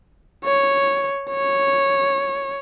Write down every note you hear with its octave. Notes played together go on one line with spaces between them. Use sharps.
C#5
C#5